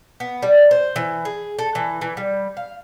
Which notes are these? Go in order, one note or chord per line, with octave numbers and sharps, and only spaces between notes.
B3
G3
C5
E3
G#4
A4
E3
E3
G3
F5